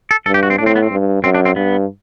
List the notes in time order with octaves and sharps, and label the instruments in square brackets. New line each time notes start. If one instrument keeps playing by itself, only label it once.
[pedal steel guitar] A4
[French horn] G2 [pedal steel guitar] A4
[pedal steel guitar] G4
F#4
C4
[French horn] A2 [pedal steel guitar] D4
[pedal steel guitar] C4
B3
C4
[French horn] G2
[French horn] F#2 [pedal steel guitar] C4
[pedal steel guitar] D4
C4
[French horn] G2 [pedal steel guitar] B3